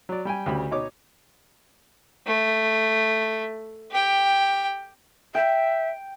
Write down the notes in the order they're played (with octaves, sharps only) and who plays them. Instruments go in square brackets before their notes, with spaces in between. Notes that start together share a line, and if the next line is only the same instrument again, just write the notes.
[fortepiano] F#3 D5
G3 G5 G#5
D2 C#3 G4 B5
B2 D#4 C#5 D6
[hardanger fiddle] A3
G4 G5
[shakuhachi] E5 [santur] G5